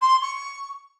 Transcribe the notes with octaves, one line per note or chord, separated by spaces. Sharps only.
C6
C#6